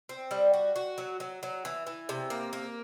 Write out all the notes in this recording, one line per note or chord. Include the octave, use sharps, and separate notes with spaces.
C4
G3
F#4
F#4
F#3
F#3
F#3
E3
E3
C3
A#3
A#3